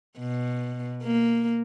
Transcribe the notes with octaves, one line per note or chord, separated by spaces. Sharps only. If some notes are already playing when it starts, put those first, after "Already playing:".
B2
A#3